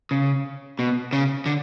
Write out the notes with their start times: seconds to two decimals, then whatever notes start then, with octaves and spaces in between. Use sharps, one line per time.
0.11 C#3
0.79 B2
1.13 C#3
1.46 D3